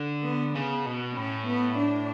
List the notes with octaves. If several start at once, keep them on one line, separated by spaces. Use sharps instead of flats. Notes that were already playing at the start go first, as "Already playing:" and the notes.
Already playing: D3
B3
C#3 B3
B2
A2 C#4
B3
D4